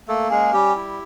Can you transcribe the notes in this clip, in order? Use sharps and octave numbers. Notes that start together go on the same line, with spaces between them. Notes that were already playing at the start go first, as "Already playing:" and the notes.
A3 A#3 A4
G#3 C#4 G#4
G3 G4
E4